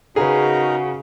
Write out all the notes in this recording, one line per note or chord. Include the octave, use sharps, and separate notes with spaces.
C#3 D#4 F#4 G#4 A#4 B4 A#5